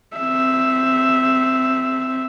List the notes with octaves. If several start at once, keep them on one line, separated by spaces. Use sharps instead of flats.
C4 E5